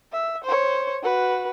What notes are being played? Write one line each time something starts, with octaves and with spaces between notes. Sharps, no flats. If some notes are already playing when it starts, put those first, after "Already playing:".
E5
C5 C#5
F#4 B4